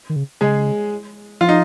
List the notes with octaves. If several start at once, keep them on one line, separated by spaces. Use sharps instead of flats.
D#3
C#3
C#3 G#3 G#4
F3 F4
D#4